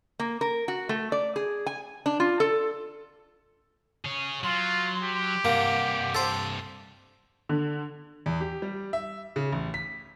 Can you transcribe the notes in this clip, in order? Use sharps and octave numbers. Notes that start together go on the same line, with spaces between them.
A#3
A#4
F#4
A3
D5
G#4
G#5
D4
F4
A4
G#4 C#5
F#3 F4 C6
G4
G2 C3 A#3 F#5
A4 C5
D3
E2
G4
G3
E5
C#3
A1
B6